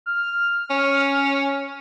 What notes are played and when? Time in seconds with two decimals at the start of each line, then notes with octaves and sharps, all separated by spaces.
0.06 F6
0.70 C#4